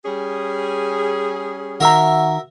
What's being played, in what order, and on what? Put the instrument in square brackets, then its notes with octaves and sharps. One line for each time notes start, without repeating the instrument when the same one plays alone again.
[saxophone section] G3 C#4 G#4
[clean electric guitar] D#3 A#5 [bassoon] F#4 [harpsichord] A#4 E5